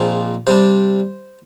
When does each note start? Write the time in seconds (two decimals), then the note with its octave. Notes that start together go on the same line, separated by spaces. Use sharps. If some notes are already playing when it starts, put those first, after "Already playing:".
Already playing: A#1 A#2 F3 C4 D#4 G#4
0.47 C3 G3 D4 C5